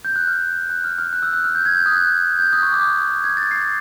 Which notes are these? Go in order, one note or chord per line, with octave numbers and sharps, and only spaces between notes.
G6
F#6
F6
F#6
F6
F6
F#6
E6
F#6
F6
G6
G#6
G6
D#6
F#6
G6
D#6
C#6
D6
D#6
G#6
A6
C7